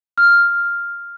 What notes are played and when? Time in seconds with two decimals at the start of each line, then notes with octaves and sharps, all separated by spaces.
0.18 F6